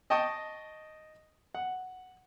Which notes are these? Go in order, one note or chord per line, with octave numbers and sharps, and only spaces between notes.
D#5 G5 A5 C#6 D#6
F#5